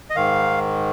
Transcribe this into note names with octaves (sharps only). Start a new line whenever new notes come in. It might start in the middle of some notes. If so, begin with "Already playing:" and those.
D#5
G#2 D#3 F5